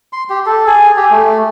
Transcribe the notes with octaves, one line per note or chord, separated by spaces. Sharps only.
C6
G4
A4
G#4
G4
A3